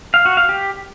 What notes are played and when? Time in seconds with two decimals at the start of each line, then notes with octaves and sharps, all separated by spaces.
0.14 F5
0.25 F#4
0.37 F5
0.49 G4